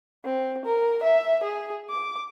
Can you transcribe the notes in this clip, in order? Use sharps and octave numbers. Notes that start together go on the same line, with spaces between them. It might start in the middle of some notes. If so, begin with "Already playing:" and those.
C4
A#4
E5
G#4
D6